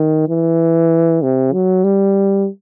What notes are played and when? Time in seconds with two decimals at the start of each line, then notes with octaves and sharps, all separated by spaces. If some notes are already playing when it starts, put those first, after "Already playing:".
Already playing: D#3
0.29 E3
1.22 C3
1.53 F#3
1.84 G3